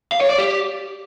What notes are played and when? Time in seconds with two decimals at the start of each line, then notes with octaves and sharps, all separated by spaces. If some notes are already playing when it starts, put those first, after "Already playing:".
0.12 F5
0.21 C#5
0.29 D5
0.38 G4